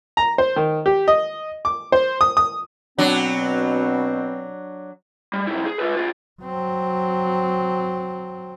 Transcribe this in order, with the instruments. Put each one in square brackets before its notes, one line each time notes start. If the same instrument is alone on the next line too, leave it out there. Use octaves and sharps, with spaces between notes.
[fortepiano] A#5
C5
D#3
G4
D#5
D6
C5
D#6
D#6
[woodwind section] B2 C4 [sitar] F#3 D4
[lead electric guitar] G3
B1 E4
G#4
F4 B4
F4 G#4
[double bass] F#3 C4